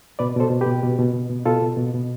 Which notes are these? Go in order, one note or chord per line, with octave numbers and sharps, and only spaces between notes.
B2 B4 D5
B2 A4 C5
B2
G4 B4
B2
B2
B2
B2
B2
B2 F4 A4
B2
B2
B2